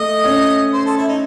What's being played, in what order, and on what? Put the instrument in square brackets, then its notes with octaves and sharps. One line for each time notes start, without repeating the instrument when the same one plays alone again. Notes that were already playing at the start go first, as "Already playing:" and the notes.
Already playing: [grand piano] A3 [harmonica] D#5
[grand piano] C#4
[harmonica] C5
A4
E4
D#4